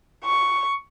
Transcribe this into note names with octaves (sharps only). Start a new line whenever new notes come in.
C#6